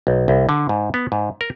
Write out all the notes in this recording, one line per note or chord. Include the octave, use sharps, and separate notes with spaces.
B1
C2
D3
G#2
B3
G#2
A#4